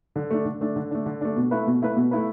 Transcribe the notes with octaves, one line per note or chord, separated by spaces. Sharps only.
D3
A3 D4
D3
A3 D4
D3
A3 D4
D3
A3 D4
B2
A3 E4 B4
B2
A3 E4 B4
B2
A3 E4 B4